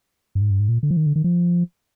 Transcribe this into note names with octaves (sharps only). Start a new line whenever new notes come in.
G2
G#2
G2
G#2
A#2
D3
F3
D#3
D3
D#3
F3